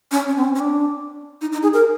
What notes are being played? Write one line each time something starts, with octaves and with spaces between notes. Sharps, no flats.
C#4
C#4
C4
C#4
C#4
D4
D#4
D#4
G#4
A#4